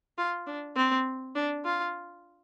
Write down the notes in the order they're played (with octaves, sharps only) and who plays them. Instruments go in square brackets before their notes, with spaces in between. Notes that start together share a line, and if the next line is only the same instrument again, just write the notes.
[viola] F4
D4
C4
D4
F4